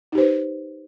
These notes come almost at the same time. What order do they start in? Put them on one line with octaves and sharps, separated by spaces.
D#4 G4 C5 B4